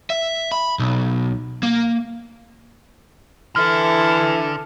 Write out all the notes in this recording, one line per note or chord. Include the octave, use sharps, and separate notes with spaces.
E5
B5
B1
A#3
D3 E3 E4 A4 F6